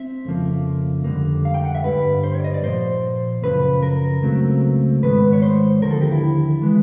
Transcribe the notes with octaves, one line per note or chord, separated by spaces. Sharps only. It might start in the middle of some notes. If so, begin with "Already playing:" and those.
Already playing: C4 E5
F2 C#3 F3 A#3
F2 D3 G3 A#3
F5
G5
F#5
E5
G2 D3 G3 B4
C5
C#5
D5
D#5
D5
A#2 F3 A#3 C5
F#2 C#3 F3 B4
A#4
C#2 C#3 F#3 A3 C4
G#2 D#3 G#3 B3 B4
C#5
C5
D#2 D3 F3 A#4
A4
G4
E4
E3 G#3 B3